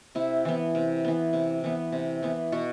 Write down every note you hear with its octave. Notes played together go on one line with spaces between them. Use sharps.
C3 E4
E3 B3
C3
E3 B3
C3
E3 B3
C3
E3 B3
B2 F#4